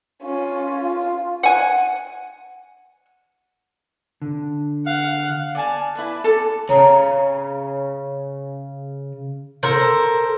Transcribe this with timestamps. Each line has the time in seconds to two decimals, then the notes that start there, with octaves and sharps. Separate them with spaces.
0.23 C#4 F4
0.81 F4
1.43 F#5 G#5
4.22 D3
4.86 F5 F#5
5.55 D5 G#5 A5
5.95 E4 B4 D5
6.24 A4 D6
6.69 C#3 C#5 A#5
9.63 A4 A#4 C5